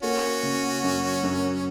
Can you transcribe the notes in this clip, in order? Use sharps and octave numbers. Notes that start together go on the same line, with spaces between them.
A#3 C#4 F#4
C#3
F#2
F#2